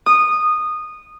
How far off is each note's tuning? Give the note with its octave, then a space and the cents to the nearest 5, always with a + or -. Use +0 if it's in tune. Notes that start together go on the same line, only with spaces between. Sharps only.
D#6 -15